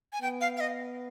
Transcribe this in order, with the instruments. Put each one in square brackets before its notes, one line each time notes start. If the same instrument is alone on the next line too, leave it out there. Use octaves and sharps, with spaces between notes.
[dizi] G#5
[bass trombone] B3 [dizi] G5
[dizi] F5
F5
D#5